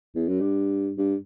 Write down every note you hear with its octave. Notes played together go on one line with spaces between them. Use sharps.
E2
F#2
G2
G2